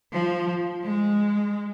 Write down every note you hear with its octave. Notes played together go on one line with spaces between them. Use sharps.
F3
G#3